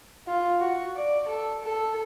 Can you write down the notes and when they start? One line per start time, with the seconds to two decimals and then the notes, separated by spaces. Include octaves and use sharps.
0.28 F4
0.60 F#4
0.97 D5
1.29 A4
1.63 A4